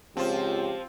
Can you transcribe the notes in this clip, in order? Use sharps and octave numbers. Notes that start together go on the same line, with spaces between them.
C#2 F3 C4 F4 G4 C5